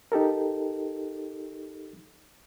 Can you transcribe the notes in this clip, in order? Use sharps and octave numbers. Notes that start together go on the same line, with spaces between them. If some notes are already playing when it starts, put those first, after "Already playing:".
D#4 G4 A4 A#4